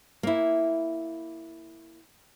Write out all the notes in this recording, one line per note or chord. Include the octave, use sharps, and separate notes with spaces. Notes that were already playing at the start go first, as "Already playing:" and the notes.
A#3 E4